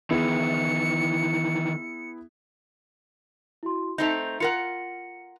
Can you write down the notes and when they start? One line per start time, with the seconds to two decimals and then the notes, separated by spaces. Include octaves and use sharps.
0.10 D#3 E3 B3 E4 G#4 C#7
3.63 E4 F#4 C6
3.98 A3 C4 D#4 G6 F7
4.40 F4 A#4 F#5 C#7